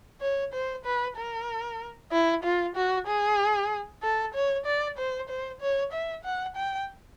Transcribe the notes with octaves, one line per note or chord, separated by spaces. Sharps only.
C#5
C5
B4
A#4
E4
F4
F#4
G#4
A4
C#5
D5
C5
C5
C#5
E5
F#5
G5